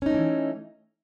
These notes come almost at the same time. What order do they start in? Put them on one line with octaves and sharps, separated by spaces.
C#4 D#4 A3 E3